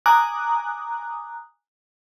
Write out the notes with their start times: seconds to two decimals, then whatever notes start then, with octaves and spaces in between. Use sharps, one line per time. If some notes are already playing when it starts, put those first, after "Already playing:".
0.06 G#5 A#5 D6 D#6 F#6